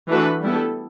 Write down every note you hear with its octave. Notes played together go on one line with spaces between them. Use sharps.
E3 A3 D4 F#4 B4
G3 B3 E4 A4